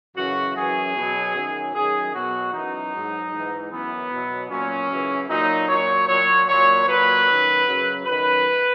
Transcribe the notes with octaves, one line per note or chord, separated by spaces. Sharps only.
F#2 C#3 E3 F#4
F#2 E3 G#4
B2 F#3
F#2 D#3 F#3
F#2 D#3 F#3 G#4
B2 F#3 F#4
F#2 E3 D#4
G#2 F#3
G#2 E3
F#2 E3 B3
B2 F#3
A#2 F#3 C#4
F#2 C#3 E3
A#2 F#3 D#4
A#2 F#3 C#5
A#2 F#3 C#5
A#2 F#3 C#5
A#2 F#3 B4
F#2 D#3 F#3
F#2 C#3 F#3
F#2 D#3 F#3 B4